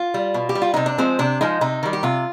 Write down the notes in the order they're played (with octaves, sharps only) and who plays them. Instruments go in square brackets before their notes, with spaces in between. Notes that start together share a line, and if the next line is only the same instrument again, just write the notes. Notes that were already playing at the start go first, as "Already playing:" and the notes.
Already playing: [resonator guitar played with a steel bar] F4
G3
B2
G4
G3
F4
C3 D#4
D4
F3 G#3 C4
C3 D4
F3 G#3 D#4
C3 D#4
D#3 G3
G4
C3 F4